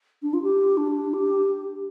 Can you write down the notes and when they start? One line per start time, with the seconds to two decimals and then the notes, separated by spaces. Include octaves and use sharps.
0.23 D4
0.33 F4
0.43 G4
0.77 D4
1.14 G4